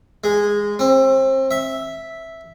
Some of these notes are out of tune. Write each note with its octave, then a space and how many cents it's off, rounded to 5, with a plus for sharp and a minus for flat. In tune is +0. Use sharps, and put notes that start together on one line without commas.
G#3 -10
C4 +30
E5 -5